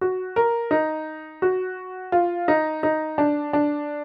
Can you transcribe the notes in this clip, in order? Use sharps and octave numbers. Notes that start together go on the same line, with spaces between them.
F#4
A#4
D#4
F#4
F4
D#4
D#4
D4
D4